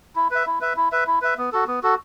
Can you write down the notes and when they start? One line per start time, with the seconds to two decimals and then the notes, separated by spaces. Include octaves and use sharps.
0.16 E4
0.31 B4 E5
0.47 E4
0.61 B4 E5
0.77 E4
0.92 B4 E5
1.07 E4
1.22 B4 E5
1.38 B3
1.52 F#4 A4
1.67 B3
1.83 F#4 A4